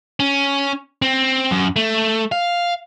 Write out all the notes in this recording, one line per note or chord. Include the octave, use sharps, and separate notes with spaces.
C#4
C4
F#2
A3
F5